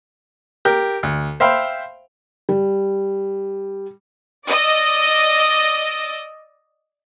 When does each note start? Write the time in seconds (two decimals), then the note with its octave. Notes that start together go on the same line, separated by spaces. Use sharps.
0.65 G4 A#4
1.03 D2
1.40 C5 E5 F5 G5 B5
2.49 G3
4.47 D5 D#5 E6